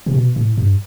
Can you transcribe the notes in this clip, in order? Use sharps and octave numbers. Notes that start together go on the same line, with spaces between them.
C3
B2
A2
G2